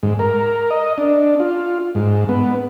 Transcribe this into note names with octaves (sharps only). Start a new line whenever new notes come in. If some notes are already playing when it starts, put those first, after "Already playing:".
G#2
A#4
D#5
D4
F4
G#2
B3